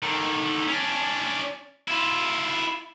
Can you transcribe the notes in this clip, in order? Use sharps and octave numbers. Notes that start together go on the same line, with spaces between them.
D3 D#3
C#4 D4
E4 F4